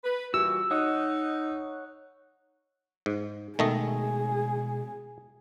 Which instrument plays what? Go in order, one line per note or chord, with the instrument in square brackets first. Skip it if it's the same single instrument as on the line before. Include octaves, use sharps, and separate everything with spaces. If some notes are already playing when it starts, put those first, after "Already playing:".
[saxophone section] B4
[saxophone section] A#2 E3 G3 [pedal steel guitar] F#4 [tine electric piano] E6
[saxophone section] D#4 [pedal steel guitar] C#5 F#5 D#6
[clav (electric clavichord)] G#2
[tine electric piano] B2 G#3 [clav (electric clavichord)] D#3 A3 D#5 [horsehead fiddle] G#4